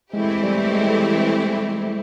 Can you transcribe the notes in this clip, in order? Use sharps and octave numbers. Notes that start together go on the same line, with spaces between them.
E3 G#3 A3 C4 E4 G4
G3
G#3